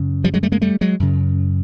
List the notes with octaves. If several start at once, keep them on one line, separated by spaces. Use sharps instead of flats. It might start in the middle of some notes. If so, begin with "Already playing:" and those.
Already playing: F#2 C#3
F3 G3
F#3 G#3
G3 A3
G#3 A#3
G3 A3
F#3 G#3
F#2 C#3